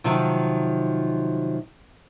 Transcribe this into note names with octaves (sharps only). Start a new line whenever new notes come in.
C3 D#3 F3 F#3